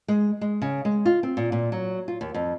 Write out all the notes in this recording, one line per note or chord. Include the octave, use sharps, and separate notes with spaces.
G#3
G#3
C#3
G#3
F4
C4
A#2
A#2
F#3
F4
D#2
F2